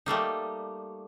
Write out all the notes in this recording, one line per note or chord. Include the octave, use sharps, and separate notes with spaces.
G3 A3 A#3 D#4